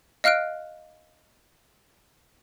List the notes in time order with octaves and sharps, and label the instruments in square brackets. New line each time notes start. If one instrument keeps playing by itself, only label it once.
[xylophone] D#5 F5 F6 F#6 D7